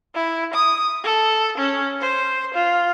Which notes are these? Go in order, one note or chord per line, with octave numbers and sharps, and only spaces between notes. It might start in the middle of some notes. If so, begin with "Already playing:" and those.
E4
D#6
A4
C#4
C5
F4